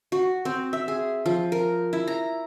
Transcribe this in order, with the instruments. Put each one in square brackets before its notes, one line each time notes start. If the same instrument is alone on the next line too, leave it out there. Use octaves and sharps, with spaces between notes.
[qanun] F#4
C4
E5
G#4
F3
A#4
E4
A#5